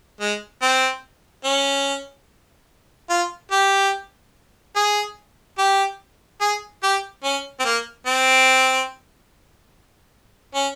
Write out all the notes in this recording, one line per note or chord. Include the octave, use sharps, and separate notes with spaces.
G#3
C4
C#4
F4
G4
G#4
G4
G#4
G4
C#4
C4
A#3
C4
C#4